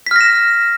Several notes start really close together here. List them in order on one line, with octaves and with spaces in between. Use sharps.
B6 F6 A#6 E7